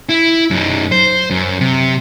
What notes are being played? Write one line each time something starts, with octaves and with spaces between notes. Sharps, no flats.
E4
F#2 D#4
C5
F#2
C3